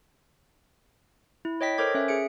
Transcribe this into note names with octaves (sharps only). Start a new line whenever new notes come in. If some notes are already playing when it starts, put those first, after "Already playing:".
E4
C#5 D#5 G5 B6
A4 A#4 C5 C#5 D6 G#6
C#4 E5
G#4 E5 C#7 D7